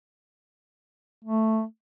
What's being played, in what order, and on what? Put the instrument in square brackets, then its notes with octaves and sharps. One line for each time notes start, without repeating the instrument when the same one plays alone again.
[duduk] A3